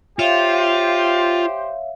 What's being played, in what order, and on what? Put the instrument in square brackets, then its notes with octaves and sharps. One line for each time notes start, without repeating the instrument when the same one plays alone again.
[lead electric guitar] F4 [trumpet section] G4 C5 [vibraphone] C#5 E5 F5